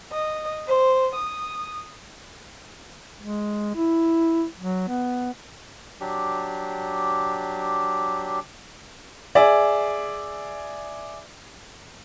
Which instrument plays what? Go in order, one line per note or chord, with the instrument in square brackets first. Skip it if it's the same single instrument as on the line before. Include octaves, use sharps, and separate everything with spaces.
[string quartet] D#5
C5
D#6
[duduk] G#3
E4
F#3
B3
[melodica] F#3 D4 G4
[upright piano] G#4 D5 E5